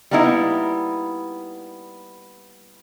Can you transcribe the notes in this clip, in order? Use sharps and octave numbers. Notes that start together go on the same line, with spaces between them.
G3 A#3 B3 D#4 E4